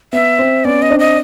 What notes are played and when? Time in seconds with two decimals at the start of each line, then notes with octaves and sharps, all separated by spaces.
0.13 B3 E5
0.39 C4
0.65 B3 C#4 D5
0.82 D#5
0.91 C4 D4
0.99 D#5